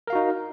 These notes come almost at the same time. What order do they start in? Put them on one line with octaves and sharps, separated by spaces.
A#4 F5 F#4 D#4